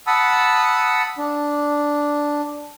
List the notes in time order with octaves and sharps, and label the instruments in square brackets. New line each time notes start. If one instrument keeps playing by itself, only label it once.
[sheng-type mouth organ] F#5 A5 B5 D#6 E6
D4